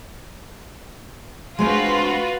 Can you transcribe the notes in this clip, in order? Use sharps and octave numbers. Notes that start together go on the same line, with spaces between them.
G#3 C4 D4 F4 F#4 B4 C6